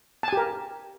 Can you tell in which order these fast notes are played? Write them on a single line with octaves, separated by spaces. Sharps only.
A5 G#5 G4 A#4